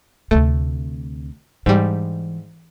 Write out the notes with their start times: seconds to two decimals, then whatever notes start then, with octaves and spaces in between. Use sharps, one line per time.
0.31 D2 C3 A3
1.66 G#2 E3 G3